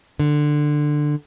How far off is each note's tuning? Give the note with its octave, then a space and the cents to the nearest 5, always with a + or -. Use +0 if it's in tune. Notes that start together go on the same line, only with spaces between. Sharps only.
D3 +15